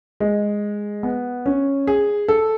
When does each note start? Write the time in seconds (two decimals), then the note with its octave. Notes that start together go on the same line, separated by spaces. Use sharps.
0.20 G#3
1.03 B3
1.46 C#4
1.87 G#4
2.28 A4